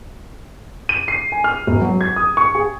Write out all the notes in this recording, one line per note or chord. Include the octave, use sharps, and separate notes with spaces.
D#7
C7
G#5
F6
E1
F#3
G#6
D#6
C#6
G#4